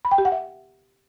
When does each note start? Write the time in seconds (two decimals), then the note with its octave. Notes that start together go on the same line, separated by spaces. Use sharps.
0.05 B5
0.11 G5
0.18 G4
0.25 F#5
0.32 E5